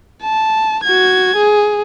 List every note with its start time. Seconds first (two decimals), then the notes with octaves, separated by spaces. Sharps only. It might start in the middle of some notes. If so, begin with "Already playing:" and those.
0.23 A5
0.84 F#4 G#6
1.36 G#4